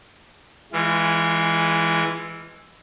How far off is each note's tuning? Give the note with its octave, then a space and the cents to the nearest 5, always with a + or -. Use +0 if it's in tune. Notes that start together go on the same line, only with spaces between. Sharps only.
E3 +0 G#3 +0 F4 -30